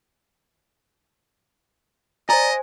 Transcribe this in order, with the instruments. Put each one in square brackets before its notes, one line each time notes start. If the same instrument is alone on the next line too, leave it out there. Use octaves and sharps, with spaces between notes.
[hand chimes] C5 G#5 [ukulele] D5 A#5 [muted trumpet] D#5